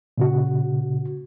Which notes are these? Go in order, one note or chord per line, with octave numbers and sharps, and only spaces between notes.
A#2 C#3 F#4